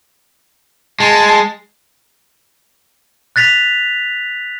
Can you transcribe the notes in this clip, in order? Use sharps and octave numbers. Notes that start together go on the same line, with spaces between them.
G#3 A5
F#6 A6 B6 F7